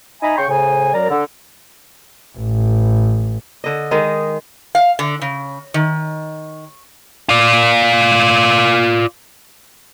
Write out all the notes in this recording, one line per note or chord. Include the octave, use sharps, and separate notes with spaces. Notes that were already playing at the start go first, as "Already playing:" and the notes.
D#4 E5 G#5 A#5 B5
C#3 G5 C6 C#6
A2 C#3 C5 G#5
F#2 F#3 A#4 D5 A#5
D3
A1
D3 D#5
D#3 G#3
F5
D3
C#3
D#3
F4 D5